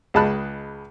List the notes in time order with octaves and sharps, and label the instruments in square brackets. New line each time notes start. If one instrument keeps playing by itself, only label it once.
[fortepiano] C#2 G#4 D#5 A5 B5 F#6